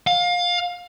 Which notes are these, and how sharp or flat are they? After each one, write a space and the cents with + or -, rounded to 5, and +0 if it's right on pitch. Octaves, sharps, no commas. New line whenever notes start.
F5 +25